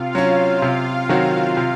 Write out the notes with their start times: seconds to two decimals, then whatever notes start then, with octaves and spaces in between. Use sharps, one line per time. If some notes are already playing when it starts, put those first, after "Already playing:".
Already playing: C3 F4 F5
0.15 F#3 C#4
0.62 C3
1.09 D#3 F#3 C4 F#4
1.57 C3